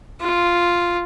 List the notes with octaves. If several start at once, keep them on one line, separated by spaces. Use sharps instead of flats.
F4